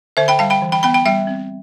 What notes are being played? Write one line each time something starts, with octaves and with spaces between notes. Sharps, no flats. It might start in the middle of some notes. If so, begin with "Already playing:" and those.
D3 C5 E5
G5 B5
G3 F5 A5
G5 B5
E3
G5 B5
B3 G5 B5
G5 B5
G3 E5 G5
C4